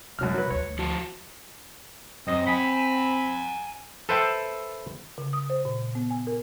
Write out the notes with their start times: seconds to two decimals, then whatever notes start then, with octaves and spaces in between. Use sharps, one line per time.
0.19 F#2 C3 F#3 G3 F6
0.34 F#3 B4
0.50 D2 C#5
0.63 D2
0.79 F3 F#4 A5
2.28 F#2 C4 D#5
2.47 F#5 G#5 B5
4.09 A4 B4 C5 E5 G5 A5
5.18 C#3
5.33 D#6
5.50 C5
5.65 A#2
5.95 B3
6.11 G#5
6.27 A#4